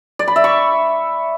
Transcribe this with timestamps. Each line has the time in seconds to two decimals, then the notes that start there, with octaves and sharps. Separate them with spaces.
0.19 D5
0.28 B5
0.36 E5
0.44 C#6